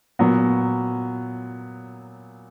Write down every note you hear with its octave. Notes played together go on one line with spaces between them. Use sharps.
A#2 F#3 B3